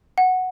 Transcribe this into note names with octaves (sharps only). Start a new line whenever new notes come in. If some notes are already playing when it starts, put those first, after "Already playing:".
F#5